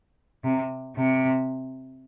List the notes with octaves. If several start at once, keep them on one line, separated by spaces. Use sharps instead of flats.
C3
C3